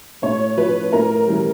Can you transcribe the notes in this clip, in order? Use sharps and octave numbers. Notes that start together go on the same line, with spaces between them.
A2 C#5
F3 B4
A2 A#4
E3 G3